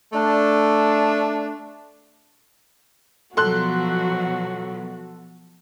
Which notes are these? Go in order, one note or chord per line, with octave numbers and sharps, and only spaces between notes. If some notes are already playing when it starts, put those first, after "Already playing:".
A3 D4
B2 F3 F#3 F#4 A4 C6 F#6